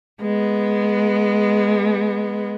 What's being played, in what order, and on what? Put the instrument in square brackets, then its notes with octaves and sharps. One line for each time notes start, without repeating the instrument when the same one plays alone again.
[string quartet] G#3 B3